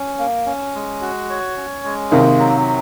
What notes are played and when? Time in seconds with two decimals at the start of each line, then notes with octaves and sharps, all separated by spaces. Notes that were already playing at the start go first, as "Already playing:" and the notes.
Already playing: C#4
0.19 A#3
0.46 C#4
0.75 G#3
1.01 F#4
1.30 C#5
1.56 C#4
1.85 G#3
2.12 C3 D#3 A#3
2.39 F#3